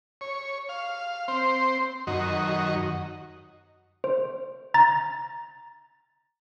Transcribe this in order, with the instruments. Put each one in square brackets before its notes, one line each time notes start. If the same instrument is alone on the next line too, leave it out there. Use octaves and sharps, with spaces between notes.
[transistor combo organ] C#5
F5
C4 C5
F#2 D#3 F#4 D#5
[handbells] C5
A#5 A6